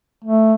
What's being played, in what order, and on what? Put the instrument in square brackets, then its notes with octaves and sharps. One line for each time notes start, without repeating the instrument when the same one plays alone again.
[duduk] A3